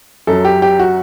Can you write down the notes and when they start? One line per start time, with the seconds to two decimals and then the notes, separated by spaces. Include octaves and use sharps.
0.27 F#2 F#3 A4
0.45 G4
0.62 G4
0.79 F#4